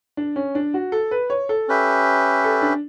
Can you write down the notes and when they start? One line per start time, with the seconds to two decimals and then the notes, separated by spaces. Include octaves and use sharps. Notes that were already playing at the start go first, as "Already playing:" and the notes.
0.17 D4
0.36 C#4
0.55 D4
0.74 F#4
0.92 A4
1.11 B4
1.30 C#5
1.49 A4
1.68 C#4 G4 B4 E5
2.44 A4
2.62 D4